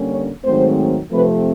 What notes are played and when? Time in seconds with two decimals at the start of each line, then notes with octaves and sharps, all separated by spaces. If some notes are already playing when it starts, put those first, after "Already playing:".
Already playing: D3 G3 A#3 C#4
0.11 C#5
0.44 G#2 D#3 F#3 A3 C4 C5
1.11 C3 F3 A3 C4 B4